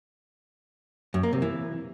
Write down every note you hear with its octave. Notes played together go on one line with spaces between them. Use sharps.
F#2
A#3
C3
E3